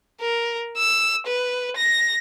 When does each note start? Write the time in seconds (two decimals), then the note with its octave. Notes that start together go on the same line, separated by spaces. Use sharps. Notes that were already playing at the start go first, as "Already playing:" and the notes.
0.21 A#4
0.78 E6
1.27 B4
1.77 A#6